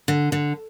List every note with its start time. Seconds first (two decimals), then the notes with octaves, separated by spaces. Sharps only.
0.08 D3
0.32 D3